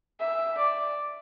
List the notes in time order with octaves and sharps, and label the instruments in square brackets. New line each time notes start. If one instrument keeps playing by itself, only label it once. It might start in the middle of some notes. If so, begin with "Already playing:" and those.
[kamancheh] E5
D5